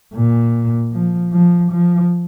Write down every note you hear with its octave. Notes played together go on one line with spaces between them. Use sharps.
A#2
F3
F3
F3